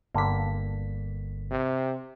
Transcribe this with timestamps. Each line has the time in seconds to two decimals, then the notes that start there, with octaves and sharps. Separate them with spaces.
0.15 G1 G2 D3 A#3 B6
1.51 C3